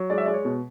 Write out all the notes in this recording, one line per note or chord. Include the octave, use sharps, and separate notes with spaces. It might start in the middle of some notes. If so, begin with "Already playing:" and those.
Already playing: F#3
G#3 D5
E5
G#3 D5
C#5
B2